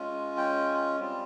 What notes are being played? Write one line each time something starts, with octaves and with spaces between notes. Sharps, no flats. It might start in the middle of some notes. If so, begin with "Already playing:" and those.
Already playing: G#3 C#4 F4
G5
G3 C4 F4